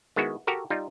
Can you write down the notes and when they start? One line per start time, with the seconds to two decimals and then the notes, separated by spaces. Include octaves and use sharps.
0.16 D#3 G#3 B3 E4 F#4
0.47 F#4 G4 A4 A#4
0.70 G3 D#4 F4